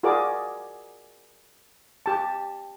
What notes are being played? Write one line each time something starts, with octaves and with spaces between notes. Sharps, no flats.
F4 F#4 G#4 A#4 D5 D6
G4 A5